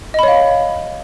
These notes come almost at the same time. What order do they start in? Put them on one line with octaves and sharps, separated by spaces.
D#5 B5 C#5 F5